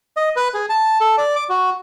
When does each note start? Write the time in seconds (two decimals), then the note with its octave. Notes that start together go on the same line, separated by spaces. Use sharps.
0.17 D#5
0.36 B4
0.54 G#4
0.69 A5
1.01 A4
1.18 D5
1.36 D6
1.49 F#4